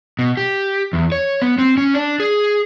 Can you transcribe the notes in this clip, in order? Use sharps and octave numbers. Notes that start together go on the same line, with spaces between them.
B2
G4
E2
C#5
B3
C4
C#4
D4
G#4